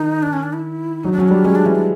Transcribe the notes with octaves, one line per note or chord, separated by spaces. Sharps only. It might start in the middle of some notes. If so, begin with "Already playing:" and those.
Already playing: D#3 D#4
D4
C#4
D4
E4
F#3 D#4
D4
F#3 C#4
G3 D4
G#3 C#4
D4
E3 C#4
D4